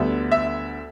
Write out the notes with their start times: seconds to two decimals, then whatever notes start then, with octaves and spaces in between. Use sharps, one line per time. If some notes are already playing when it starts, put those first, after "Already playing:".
Already playing: D2 D3 G3 B3 E5
0.32 E5